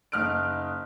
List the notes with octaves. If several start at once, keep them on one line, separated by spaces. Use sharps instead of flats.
F#1 D#4 F6 F#6 D7